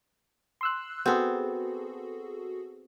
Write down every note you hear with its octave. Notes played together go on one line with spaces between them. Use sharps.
C6 E6 F#6
B3 C4 F#4 G#4 A4